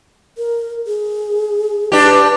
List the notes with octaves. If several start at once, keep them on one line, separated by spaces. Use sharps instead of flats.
A#4
G#4
D4 G4 B4